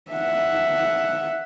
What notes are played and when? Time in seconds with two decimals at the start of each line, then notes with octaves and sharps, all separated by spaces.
0.11 E5 F#5